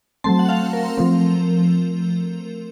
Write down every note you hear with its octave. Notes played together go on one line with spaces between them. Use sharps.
F#3 A3 C4 A5 C6
F#5
F5 A5
A#4
F3 A3 C4